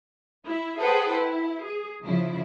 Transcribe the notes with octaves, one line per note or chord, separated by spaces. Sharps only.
E4 E5
G#4 A4 B4 C5 F#5 G5
E4
G#4
C#3 F3 E4